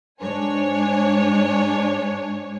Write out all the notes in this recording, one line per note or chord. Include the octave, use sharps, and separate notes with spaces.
G#2 D4 C#5 G#5